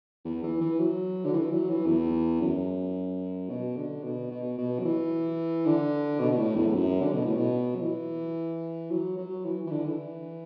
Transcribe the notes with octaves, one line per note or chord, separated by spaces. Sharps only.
E2
E3
E3
F#3
D3
E3
F#3
E3
E2
F#2
B2
D3
B2
B2
B2
F#3
E3
D3
B2
B2
A2
E2
A2
F#2
D3
B2
A2
B2
F#3
E3
F#3
F#3
E3
E3
D3
E3